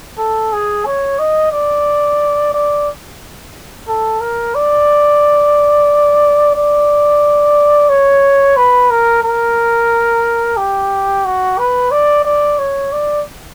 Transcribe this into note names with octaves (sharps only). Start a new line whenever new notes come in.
A4
G#4
C#5
D#5
D5
D5
A4
A#4
D5
D5
C#5
B4
A#4
A#4
G4
F#4
B4
D5
D5
C#5
D5